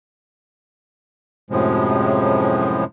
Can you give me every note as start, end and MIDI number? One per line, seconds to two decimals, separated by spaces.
1.50 2.84 42
1.50 2.84 45
1.50 2.84 48
1.50 2.84 53
1.50 2.84 56